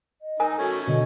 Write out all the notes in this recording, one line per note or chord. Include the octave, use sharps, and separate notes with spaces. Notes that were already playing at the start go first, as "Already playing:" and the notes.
D#5
D#4 A#4 G#5
A3 C#4 F#4
B2 D3 D#5